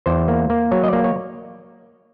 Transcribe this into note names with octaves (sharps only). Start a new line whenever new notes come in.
E2 C5
A#3
A#3
F#3 C#5
D#5
A#3 D5
C#5